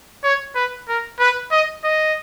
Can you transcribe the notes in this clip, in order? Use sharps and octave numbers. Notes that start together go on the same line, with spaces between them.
C#5
B4
A#4
B4
D#5
D#5